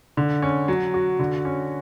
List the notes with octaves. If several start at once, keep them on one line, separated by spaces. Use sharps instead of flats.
D3
C#4
F#3
F#4
D3
C#4